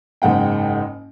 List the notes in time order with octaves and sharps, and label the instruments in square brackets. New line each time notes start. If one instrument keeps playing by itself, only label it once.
[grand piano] F#1 G#2 F#5 G5